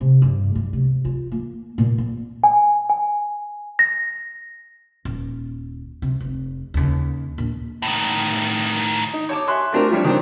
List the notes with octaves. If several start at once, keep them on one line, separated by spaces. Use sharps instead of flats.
C3
G2
G#3
C3
F4
A#3
A#2
C4
G#5
G#5
A#6
D#1
C3
F1
D#2 C#3
A#1
A2 D#3
D#4
C#5 A5 D6
E5 G#5 C6 C#6 F#6
A3 C4 D4 F4 A#4
F3 G3 D4 C#5
D#3 C4 D4